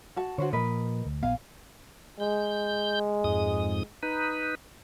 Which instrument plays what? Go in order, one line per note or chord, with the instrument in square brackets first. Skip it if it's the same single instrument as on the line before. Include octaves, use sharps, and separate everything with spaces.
[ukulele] F#4 A5
[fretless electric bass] D3 [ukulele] F#4 C5 C#5
[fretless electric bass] A#2 F3 [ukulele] A#4 B4 D#5
[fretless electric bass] D2
[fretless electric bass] A#1 B3 [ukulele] F5 G#5
[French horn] G#3 [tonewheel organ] G6
[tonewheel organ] F2 G#2 D#6
D#4 B4